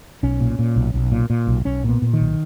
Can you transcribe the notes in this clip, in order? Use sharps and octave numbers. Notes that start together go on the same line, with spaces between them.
B1 C#4
A#2
A#2
B1
B1
A#2
A#2
B1
B1 C#4
A#2 B3
A#2
D#3
B1